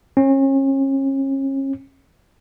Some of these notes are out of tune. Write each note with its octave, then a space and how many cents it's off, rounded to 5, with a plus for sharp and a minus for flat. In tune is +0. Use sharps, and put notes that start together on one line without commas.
C#4 -35